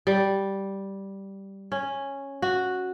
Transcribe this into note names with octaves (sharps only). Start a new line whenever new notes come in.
G3
C#4
F#4